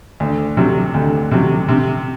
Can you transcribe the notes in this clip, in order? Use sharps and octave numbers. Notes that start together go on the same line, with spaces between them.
D2
C3 F#3
D2
C3 F#3
C3